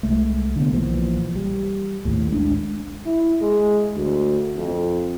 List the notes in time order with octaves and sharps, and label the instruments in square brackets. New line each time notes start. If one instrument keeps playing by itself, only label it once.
[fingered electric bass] C2 G#3 A3
D3 B3
B1 A#2 E3 F3
G3
A#1 D#2 A2
G#3 C#4 D4
[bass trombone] E4
G#3
D2
F2